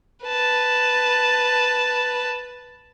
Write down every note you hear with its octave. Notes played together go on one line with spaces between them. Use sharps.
B4 A5